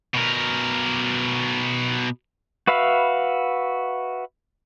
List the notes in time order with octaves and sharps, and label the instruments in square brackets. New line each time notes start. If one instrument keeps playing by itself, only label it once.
[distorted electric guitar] B2 A#4
[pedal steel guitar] F#4 B4 E5 F5 B5